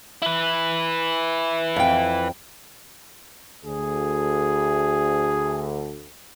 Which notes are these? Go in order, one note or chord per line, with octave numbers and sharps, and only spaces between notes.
E4 B4
F2 G5
D2 G#4